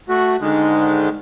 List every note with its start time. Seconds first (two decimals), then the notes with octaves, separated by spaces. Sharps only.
0.09 A3 F#4
0.40 G#2 D3 D#3 G#3